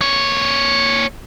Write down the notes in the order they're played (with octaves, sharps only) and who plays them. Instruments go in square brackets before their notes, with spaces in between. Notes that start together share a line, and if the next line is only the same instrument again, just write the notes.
[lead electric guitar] A#3 C#5